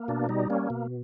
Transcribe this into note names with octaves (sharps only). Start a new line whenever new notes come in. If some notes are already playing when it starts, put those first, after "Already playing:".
Already playing: A#3
B2 D4
G3 D#4
A#3 C#4
B2